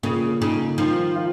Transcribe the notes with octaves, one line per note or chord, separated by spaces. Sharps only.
A#2 C#3
C#3 D#4
D#3 F3
F4